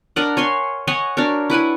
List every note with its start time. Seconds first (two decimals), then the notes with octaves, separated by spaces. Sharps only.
0.16 D4 A#4 D#5 F#5
0.37 C#5 G#5 C6
0.87 C#5 D#5 F#5 G#5
1.17 D4 F#4 A#4 C#5
1.50 E4 B4 F#5 G#5